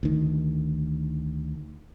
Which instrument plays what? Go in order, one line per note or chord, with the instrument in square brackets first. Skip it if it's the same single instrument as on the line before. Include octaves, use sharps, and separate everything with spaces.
[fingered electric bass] D2 D#3